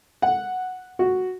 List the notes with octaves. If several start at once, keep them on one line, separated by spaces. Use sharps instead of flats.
F#5
F#4